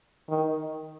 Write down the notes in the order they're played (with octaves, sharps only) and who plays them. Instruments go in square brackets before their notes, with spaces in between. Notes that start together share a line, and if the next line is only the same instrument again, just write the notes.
[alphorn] D#3